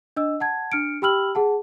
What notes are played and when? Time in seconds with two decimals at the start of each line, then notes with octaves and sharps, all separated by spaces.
0.16 D4 D#5 E6
0.40 F#5 A5 G#6
0.72 D4 F6 C#7 D7
1.02 G4 G5 B5 E6 F6 F#7
1.35 G#4 F#5 A5